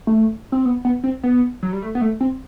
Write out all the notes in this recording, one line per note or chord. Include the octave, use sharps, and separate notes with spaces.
A3
C4
B3
B3
C4
B3
F#3
G3
A3
B3
A3
C4